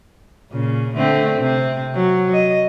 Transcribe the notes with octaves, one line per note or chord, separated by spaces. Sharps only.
A#2 C#3
D3 A3 C4
C3 C4
F#3
D#5